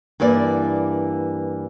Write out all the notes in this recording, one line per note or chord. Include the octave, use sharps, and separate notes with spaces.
G2 E3 A#3 D5